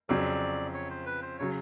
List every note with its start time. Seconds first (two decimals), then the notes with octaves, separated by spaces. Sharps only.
0.09 F2 C#3 F#3 D5
0.74 C#5
0.90 C5
1.06 B4
1.22 C5
1.39 C#3 F#3 C#5